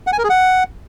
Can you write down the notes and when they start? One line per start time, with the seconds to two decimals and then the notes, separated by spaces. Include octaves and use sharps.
0.07 F#5
0.13 G#5
0.18 A#4
0.24 G#4
0.30 F#5